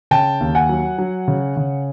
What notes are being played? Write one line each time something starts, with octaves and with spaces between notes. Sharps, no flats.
C#3 G5 A5
D#2
F#5 G#5
F#3
F#3
C#3
C#3